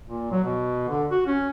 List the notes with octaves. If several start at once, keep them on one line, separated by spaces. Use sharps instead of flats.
A#2
F#3
B2
D3
F#4
C#4